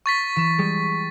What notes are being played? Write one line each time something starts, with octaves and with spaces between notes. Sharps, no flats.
C#6 A6 B6
E3 E7
G3 G#3